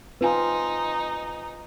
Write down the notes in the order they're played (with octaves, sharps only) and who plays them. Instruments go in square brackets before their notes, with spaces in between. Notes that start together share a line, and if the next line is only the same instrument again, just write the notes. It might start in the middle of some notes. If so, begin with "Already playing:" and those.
[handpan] C4 F4 [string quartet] D#4 [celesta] B4 G#5